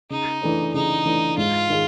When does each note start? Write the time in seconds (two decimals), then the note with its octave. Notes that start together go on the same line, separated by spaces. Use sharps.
0.10 C#3 D#4
0.41 E3 A3 D4
0.74 C#3 D#4
1.05 E3 A3 D4
1.37 G#2 F4
1.70 D#3 G#3